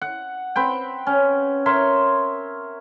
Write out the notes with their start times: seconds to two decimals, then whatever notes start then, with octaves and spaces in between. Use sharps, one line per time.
0.02 F#5
0.56 C4 B4 G5
1.07 C#4
1.66 A#4 C#5 E5 C6